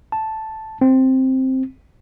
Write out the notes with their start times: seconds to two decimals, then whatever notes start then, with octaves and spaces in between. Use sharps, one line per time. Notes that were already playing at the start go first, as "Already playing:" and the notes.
0.12 A5
0.81 C4